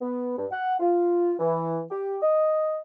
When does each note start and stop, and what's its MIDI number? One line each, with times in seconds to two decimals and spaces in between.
0.01 0.36 59
0.37 0.46 43
0.51 0.75 78
0.80 1.32 65
1.39 1.80 52
1.90 2.16 67
2.22 2.78 75